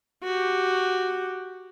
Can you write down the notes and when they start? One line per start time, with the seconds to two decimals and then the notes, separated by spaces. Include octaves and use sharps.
0.24 F#4 G4